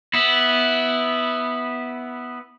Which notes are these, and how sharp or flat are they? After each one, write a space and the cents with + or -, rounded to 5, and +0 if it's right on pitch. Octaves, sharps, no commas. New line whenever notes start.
B3 +0 E4 -10